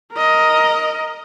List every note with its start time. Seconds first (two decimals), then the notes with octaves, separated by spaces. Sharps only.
0.12 A#4 D#5